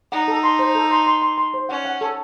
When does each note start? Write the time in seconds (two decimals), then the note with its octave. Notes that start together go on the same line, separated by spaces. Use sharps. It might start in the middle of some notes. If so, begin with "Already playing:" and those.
0.12 D#4 F#5
0.28 A4
0.43 C6
0.59 C5
0.75 A4
0.91 C6
1.07 C6
1.22 C6
1.38 C6
1.54 C5
1.69 C#4 F#5
1.85 F#5
2.01 A4